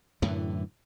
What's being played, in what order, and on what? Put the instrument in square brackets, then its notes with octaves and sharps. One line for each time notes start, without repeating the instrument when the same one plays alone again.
[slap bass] F#2 A2 D3 E3